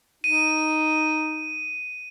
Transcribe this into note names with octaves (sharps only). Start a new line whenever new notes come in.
D#4 D#7